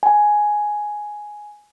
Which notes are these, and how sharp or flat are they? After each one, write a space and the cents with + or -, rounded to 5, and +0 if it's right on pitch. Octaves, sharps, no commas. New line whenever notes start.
G#5 +5